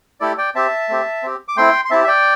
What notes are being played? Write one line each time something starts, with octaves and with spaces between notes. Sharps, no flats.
A3 E4 G4 A4 D5
D5 G5
C4 G4 E5 A5
A3 C4 G4
C4 G4
D6
A3 C4 E4 G5 C6
C6
C4 E4 G4 E5 A5
E5
D5 G5